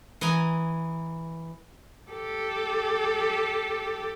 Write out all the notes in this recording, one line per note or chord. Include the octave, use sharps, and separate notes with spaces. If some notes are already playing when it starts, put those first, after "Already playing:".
E3 D#5 G#5 A#5
G4 A4